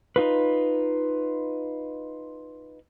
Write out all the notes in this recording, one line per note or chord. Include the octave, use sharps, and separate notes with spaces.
D#4 F4 B4